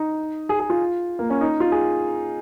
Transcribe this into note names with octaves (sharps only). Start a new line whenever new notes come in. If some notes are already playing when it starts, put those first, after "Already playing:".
Already playing: D#4
G#4
G#4
F4
A#3
C#4
D#4
F4
G#4